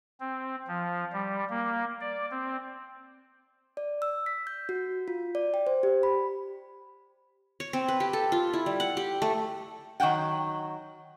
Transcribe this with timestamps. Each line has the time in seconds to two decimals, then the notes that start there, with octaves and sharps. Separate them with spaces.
0.20 C4
0.68 F3
1.13 G3
1.50 A#3
2.00 D5
2.31 C4
3.77 D5
4.02 E6
4.26 B6
4.47 G6
4.69 F#4
5.08 F4
5.35 D5
5.54 G5
5.67 C5
5.83 G4
6.03 B5
7.60 C#5
7.73 C4
7.88 B4
8.00 G4
8.13 A4
8.32 F4
8.53 E4
8.66 G3
8.80 F#5
8.97 G4
9.22 A3
10.00 D#3 F#3 F#5 G5